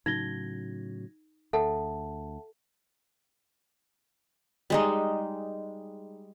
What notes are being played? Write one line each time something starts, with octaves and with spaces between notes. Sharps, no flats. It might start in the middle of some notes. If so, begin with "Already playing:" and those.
A2 C#3 F#3 D#4 G#6 A#6 G7
D2 A4 E5 F#5 A5
G3 G#3 D#4